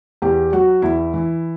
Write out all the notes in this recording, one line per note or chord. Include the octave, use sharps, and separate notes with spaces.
E2 G4
F#3 F#4
E2 E4
E3